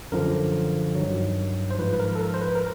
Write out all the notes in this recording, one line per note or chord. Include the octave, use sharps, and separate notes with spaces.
F#2 D3 F3 A#4
G2 D#3 F#3
C5
G#2 F3 B4
B4
A#4
A4
A#4
C5
B4
A#4